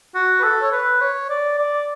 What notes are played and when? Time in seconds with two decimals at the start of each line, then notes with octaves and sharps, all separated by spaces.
0.15 F#4
0.40 B4
0.43 A4
0.62 C#5
0.72 B4
1.01 C#5
1.29 D5
1.59 D5